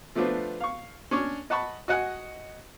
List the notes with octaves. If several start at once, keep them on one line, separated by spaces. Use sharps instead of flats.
F3 A3 B3 D4 F4 C5
F5 C#6
C#4 D4 C#6
D#5 F#5 A5 B5 C#6
F#4 D#5 F#5 G#5